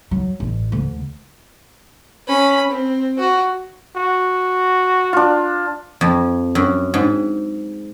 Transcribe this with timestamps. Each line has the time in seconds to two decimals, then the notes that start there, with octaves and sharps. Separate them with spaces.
0.11 F#3
0.40 A1
0.72 D2
2.27 C#4 B5
2.70 C4
3.19 F#4
3.96 F#4
5.13 D4 F4
6.01 F2
6.55 F#2
6.94 G#2